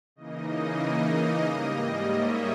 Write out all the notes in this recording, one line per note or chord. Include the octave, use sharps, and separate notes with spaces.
C#3 E3 A#3 D#4 D#5
G#2 G3 A#3
C#5 E5